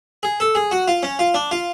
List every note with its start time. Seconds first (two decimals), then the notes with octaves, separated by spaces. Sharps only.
0.23 G#4
0.40 A4
0.55 G#4
0.71 F#4
0.88 F4
1.03 C#4
1.19 F4
1.34 D4
1.51 F4